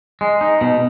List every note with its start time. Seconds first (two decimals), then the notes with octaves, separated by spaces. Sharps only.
0.21 G#3
0.41 D#4
0.61 B2